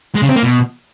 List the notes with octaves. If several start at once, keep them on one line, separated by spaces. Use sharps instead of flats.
G#3
C#3
C4
A#3
B2